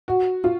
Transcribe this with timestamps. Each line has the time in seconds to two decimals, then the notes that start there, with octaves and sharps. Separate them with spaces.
0.08 F#4
0.44 F4